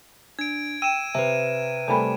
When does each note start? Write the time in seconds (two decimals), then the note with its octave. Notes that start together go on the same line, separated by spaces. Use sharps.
0.39 D4 G#6 D7
0.82 G5 E6 D#7 E7
1.15 C3 B4 E5
1.88 C3 G3 A3 A#4 G#5 B5